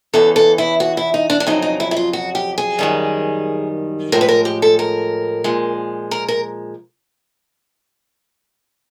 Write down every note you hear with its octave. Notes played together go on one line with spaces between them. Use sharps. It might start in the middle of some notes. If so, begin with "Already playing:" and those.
E2 C#3 E3 A4
A4
E4
F#4
E4
D#4
D4
D4
F2 C#3 F#3 D#4
D#4
E4
E4
F4
F#4
G4
G#4
F#2 D#3 G3
A2 F3 G#3 A#4
B4
A#4
G4
A4
A#4
A#2 F3 G#3
A#4
A#4